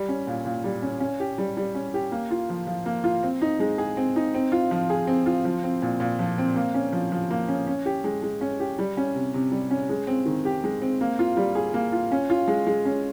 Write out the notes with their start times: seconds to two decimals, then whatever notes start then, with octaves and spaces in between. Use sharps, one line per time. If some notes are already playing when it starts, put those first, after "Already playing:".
Already playing: G3
0.09 C#4
0.27 A#2
0.45 A#2
0.64 G3
0.82 C#4
1.00 C#4
1.20 G4
1.38 G3
1.57 G3
1.75 C#4
1.94 G4
2.12 A#3
2.31 F4
2.50 F3
2.67 F3
2.86 A#3
3.04 F4
3.23 C4
3.42 D#4
3.60 G#3
3.78 G#4
3.97 C4
4.16 D#4
4.34 C4
4.52 F4
4.71 F3
4.90 G#4
5.07 C4
5.26 F4
5.45 F3
5.63 C4
5.82 A#2
6.00 A#2
6.19 F3
6.38 C4
6.56 A#3
6.74 C#4
6.92 F3
7.12 F3
7.30 A#3
7.48 C#4
7.67 C#4
7.86 G4
8.04 G#3
8.23 G#3
8.41 C#4
8.60 G4
8.79 G3
8.97 C#4
9.15 C3
9.34 C3
9.52 G3
9.71 C#4
9.89 G#3
10.07 C4
10.26 D#3
10.45 G4
10.64 G#3
10.82 C4
11.01 A#3
11.19 F4
11.37 G3
11.55 G#4
11.74 A#3
11.92 F4
12.12 C#4
12.30 F4
12.48 G#3
12.67 G#3
12.85 C#4